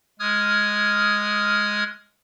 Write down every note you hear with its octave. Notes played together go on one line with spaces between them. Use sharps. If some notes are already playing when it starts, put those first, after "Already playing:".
G#3 D#6 F6 G#6